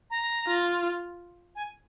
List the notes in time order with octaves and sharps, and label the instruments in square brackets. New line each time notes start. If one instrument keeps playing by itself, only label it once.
[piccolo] A#5
[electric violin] F4
[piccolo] G#5